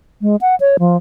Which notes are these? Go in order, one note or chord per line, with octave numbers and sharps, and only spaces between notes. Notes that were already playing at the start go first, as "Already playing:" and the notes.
G#3
F#5
C#5
F3